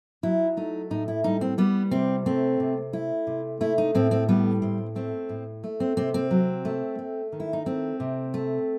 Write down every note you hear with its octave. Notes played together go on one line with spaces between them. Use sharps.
F#3 E4
A3 D#4
A2 D#4
E4
G3 D#4
C4
G3 B3
C3 C4
A3 C4
C3
A3 E4
C3
A3 E4
D#4
A2 C4
C4
G3 B3
A2 C4
A3 C4
A2
A3
C4
C3 C4
C4
F#3
A3
A3
D#3
E4
D#4
A3 C4
C3
A3